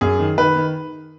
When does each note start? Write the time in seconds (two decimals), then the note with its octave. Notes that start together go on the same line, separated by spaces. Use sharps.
0.01 F#2 G#4
0.19 D#3
0.38 D#3 B4
0.56 D#3